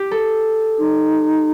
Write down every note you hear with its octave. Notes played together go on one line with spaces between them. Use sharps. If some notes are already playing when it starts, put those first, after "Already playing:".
Already playing: G4
A4
D#4